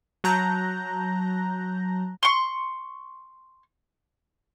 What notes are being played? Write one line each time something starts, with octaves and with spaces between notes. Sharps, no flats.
F#3 A5 A#5 F#6 G6 A#6
C6 C#6